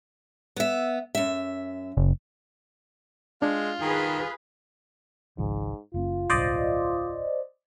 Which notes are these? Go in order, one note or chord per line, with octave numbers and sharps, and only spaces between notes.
B3 E5
F#2 E5
F#1
G#3 D4 F4
D#3 G#4 B4
G#1 C#2 G#2 F3
F#1 A#3 C#4 F4
D1 B1 G2 C5 D5 D#5